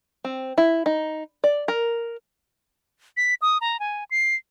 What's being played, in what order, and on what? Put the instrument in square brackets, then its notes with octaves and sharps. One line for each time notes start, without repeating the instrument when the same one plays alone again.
[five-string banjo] C4
E4
D#4
D5
A#4
[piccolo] B6
D#6
A#5
G#5
C7